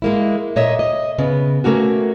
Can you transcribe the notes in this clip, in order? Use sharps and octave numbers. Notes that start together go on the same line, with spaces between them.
G#3 A#3 E4
A#2 C#5 D#5 E5
D#5
C#3 B3
A3 A#3 C#4 F#4